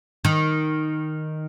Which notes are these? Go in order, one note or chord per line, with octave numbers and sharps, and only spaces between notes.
D#3